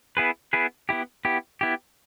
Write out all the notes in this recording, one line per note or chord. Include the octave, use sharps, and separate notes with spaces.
B3 E4 G#4 B4
B3 E4 G#4 B4
B3 E4 G4
B3 E4 G4
B3 E4 G4